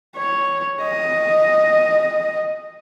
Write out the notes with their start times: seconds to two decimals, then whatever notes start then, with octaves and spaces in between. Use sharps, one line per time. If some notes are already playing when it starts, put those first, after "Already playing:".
0.16 C#5
0.82 D#5